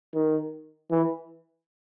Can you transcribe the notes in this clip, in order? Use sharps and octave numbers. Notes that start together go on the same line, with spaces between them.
D#3
E3